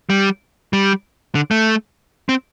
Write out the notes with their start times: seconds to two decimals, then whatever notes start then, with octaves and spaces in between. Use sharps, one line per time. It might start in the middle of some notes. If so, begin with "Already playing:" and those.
0.10 G3
0.73 G3
1.35 D3
1.51 A3
2.29 C4